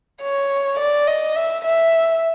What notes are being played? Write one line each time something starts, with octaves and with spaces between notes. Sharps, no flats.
C#5
D5
D#5
E5
E5